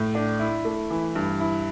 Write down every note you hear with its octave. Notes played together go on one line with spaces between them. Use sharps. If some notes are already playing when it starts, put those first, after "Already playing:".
Already playing: A2
D4
E4
A3
E3
G2
E4